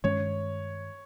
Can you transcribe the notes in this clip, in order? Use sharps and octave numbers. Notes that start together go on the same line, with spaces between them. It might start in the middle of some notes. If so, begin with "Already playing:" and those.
G2 D#3 G#3 C#4 C#5